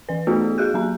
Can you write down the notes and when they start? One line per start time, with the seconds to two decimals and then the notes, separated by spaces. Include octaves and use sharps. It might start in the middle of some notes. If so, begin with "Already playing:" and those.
0.09 E3 B4
0.27 A3 B3 D#4 F4 F#4 A4
0.58 F#4 G#4 F#6 G6
0.74 F#3 A#3 A#5